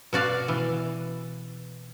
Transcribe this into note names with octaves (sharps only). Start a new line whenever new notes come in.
B2 F#4 D5 F5
E3